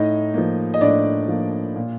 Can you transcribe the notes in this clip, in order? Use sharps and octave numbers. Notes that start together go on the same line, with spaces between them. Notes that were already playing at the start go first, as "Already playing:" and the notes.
Already playing: A2 D#4 D#5
F3 A#3
D#5
A2 D4 D5
F3 A#3
A#2